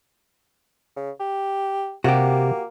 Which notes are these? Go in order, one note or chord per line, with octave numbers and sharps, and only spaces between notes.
C#3
G4
C3 A#3 F#4 G4